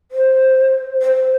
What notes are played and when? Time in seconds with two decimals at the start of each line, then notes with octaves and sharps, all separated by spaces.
0.12 C5
1.02 C5